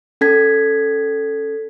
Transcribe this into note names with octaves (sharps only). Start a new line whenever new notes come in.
C#4 A4 G#6 B6